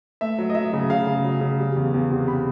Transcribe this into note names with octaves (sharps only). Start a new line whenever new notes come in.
A3 E5
F#3
D#5
F#3 E5
C#3
C#3 F5
C#3
F#3
C#3
G3
E2
E2
C3
B5